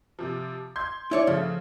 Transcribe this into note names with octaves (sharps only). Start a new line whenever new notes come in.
C3 F3
C6 G6 G#6
E4 C#5 D5
C#3 F3 A3